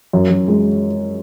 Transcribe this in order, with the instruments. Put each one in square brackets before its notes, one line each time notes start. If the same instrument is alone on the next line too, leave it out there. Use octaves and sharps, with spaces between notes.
[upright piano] F#2
F#2
G#3